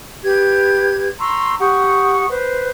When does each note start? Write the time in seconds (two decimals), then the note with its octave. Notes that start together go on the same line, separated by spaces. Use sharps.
0.23 G4 B4 G#6
1.19 A#5 C6 C#6 E6
1.60 G4 F#5 C#6 D#6
2.29 B4 C5